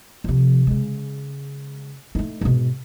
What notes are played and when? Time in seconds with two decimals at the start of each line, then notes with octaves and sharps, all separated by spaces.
0.24 C3 F3
0.67 C#3 G#3
2.15 A3 D#4
2.41 G#2 B2